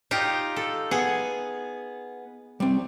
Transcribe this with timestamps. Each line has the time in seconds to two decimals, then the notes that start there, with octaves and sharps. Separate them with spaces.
0.11 D#4 F4 G4
0.56 A4
0.91 B3 G#4 F#5
2.60 G3 C4